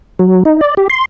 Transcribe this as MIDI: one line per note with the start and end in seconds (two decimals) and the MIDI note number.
0.19 0.43 54
0.45 0.61 63
0.61 0.74 74
0.77 0.88 67
0.90 1.05 84